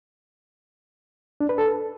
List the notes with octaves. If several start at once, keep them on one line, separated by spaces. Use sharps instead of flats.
D4
B4
A4